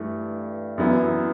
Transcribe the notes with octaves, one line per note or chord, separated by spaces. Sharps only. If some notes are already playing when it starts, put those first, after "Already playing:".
Already playing: G2 E3 A3
F#2 E3 B3 E4